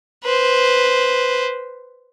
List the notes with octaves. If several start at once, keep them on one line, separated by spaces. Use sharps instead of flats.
B4 C5